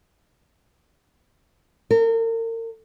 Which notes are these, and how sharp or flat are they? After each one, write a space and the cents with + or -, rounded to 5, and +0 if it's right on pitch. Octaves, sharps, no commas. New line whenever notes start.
A#4 -40